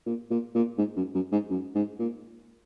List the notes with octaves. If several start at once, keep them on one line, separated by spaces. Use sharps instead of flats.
A#2
A#2
A#2
G#2
F#2
F#2
G#2
F#2
G#2
A#2